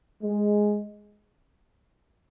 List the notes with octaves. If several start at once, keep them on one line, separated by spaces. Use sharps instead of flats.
G#3